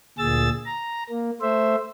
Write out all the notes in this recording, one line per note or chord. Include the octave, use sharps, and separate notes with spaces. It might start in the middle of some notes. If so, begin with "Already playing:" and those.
D2 A#2 G#4 E6 A6
A#5
A#3
A3 C5 E5